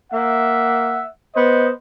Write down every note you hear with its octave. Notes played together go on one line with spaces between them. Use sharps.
A#3 E5 F#5
B3 C5 D#5